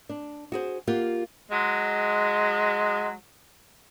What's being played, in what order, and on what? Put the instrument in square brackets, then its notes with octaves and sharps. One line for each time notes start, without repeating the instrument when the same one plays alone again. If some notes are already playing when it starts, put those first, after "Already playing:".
[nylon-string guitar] D4
F#4 G#4 C5
A#3 F4 G4 F#5
[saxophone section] F#3 G#3